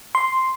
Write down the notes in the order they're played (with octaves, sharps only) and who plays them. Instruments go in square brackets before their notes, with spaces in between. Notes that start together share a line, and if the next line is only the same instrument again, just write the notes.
[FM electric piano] C6